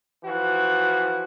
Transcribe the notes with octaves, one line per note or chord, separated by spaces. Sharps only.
E3 F3 F#4